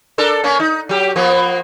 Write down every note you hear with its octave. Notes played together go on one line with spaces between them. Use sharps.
D4 A4 A#4
A#3 C#4
D#4
F#3 G4
F3 A#3 B3